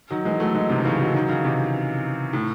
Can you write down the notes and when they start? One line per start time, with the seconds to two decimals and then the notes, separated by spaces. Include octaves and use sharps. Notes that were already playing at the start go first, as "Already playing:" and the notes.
0.10 D#3 F#3
0.25 E3 G#3
0.40 F#3 A3
0.55 E3 G#3
0.69 G#2 C3
0.80 D#3
0.85 C#3 E3
0.99 D#3 F#3
1.14 D#3 F#3
1.29 C#3 E3
1.44 C3 D#3
2.33 A2